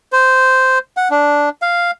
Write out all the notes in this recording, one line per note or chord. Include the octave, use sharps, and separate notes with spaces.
C5
F#5
D4
F5